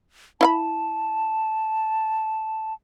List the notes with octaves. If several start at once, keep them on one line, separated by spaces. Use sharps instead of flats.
E4 F5 A5 B5